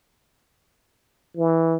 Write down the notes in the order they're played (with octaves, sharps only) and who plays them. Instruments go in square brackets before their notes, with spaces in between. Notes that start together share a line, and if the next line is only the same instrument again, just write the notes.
[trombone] E3